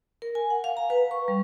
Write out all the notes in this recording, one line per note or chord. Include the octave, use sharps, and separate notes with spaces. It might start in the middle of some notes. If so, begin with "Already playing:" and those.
A#4
G#5
F#5
F5
A#5
B4
C#6
G3